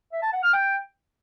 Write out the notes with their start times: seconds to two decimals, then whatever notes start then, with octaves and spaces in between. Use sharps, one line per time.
0.12 E5
0.23 A5
0.33 F#5
0.43 F6
0.53 G5